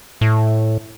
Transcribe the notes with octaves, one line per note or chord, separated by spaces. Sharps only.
A2